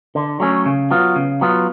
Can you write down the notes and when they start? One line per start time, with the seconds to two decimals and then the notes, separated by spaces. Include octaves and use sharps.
0.15 D3
0.40 F#3 A3 C#4
0.66 C#3
0.91 F#3 B3 F4
1.16 C#3
1.41 F#3 B3 F4